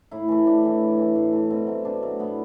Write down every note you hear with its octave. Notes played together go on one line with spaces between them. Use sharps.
A2 E4
E3 A3
A2 D4
E3 A3
A2
E3 A3
A2
E3 A3
B2 C4
F#3 A3
B2 D4
F#3 A3
A2 B3